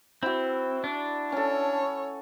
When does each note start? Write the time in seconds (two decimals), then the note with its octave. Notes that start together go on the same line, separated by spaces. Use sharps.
0.23 C4 E4 F#4
0.84 D4
1.32 C#4 A4 C#5